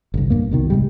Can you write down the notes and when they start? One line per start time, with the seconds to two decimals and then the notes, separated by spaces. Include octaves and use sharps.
0.14 G1 C2
0.30 A#1 G2 A#3
0.51 C2 B2 D#3
0.70 C2 G#2 G3